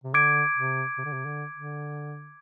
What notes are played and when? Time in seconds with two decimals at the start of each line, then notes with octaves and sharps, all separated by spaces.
0.04 C3
0.14 D3 D6 G#6 D7
0.56 C3
0.98 C3
1.05 D3
1.13 C3
1.26 D3
1.54 D3